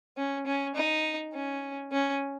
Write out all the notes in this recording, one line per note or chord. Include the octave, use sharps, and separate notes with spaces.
C#4
C#4
D#4
C#4
C#4